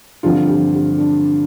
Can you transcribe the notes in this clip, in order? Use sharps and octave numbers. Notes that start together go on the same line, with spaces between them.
G2 D3 F3 C4 F4
G4
G4
D4